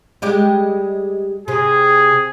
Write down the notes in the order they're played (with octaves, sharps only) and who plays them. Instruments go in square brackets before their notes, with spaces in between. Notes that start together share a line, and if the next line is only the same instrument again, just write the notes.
[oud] G3 G#3 G4
[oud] C3 [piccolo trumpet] G#4